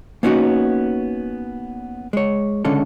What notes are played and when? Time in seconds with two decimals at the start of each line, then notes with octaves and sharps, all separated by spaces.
0.23 A#3 B3 C#4 D#4 F4 F#4
2.13 G#3 C#5
2.65 C#2 D3 G#3 C#4 A4